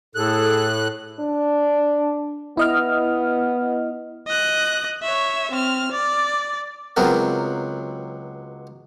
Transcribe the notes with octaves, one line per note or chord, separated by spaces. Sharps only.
A2 G#4 A4 F#6
D4
B3 E4 D#5 F6
D#5 F#6
C#5 E5
C4 F6
D5
C#2 F#3 B3 C4 A#4